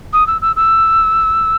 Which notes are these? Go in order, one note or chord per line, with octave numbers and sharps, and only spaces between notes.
D#6
E6
E6
E6